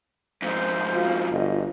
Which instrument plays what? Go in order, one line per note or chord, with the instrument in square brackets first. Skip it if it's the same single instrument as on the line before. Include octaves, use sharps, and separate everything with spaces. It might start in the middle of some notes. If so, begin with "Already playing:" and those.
[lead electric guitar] F2 G#2 [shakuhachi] C5
[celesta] F4 F#4 F5
[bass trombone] G1 [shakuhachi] D#5